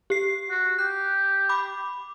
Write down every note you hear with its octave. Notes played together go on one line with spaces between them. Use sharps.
G4 C7
F#4
G4 F#6
B5 D6